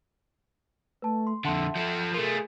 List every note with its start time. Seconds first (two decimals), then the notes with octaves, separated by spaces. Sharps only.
1.02 A3 B4 A5
1.27 C6
1.45 F2 D3 E5 F#5 A5 C6
1.76 F3 A4
2.14 A3 F4 G#4 A#4